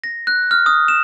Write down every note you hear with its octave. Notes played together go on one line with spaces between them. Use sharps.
A#6
F#6
F6
D#6
E7